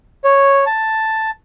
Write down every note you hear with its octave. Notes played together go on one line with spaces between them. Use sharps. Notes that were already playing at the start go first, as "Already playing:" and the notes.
C#5
A5